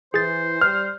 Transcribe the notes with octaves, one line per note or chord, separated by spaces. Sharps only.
E3 G#4 C5 A6
G3 F6